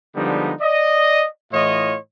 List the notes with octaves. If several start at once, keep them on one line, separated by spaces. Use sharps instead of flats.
D3 F3 G3 G#3 B3 D#4
D5 D#5
A2 E3 F4 C#5 D#5